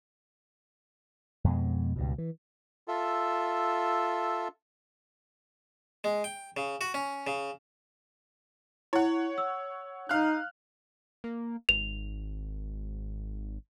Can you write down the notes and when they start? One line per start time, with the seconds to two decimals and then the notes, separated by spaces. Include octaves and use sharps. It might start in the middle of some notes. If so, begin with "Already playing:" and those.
1.44 F2 B2 G#3
1.96 C#2 G2 B2
2.18 E3
2.88 F4 A4 E5
6.04 G#3
6.24 G5
6.57 C#3
6.81 F#4
6.94 C#4
7.27 C#3
8.93 E4 C#5 F#5
9.38 E6
10.09 D#4 F5 F6 F#6
11.24 A#3
11.69 G#1 F7